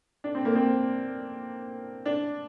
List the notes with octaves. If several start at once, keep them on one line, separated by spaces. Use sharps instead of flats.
D4
C4
A#3
C4
D4